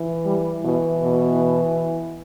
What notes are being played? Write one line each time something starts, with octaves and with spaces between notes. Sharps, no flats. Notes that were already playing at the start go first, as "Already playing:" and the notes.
Already playing: E3
G3
B2 E3
B2